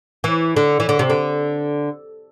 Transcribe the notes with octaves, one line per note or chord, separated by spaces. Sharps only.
E3
D3
E3
D3
C3
D3